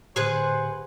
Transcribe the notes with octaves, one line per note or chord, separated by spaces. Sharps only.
A2 D3 G4 G#4 B4 C5 F#5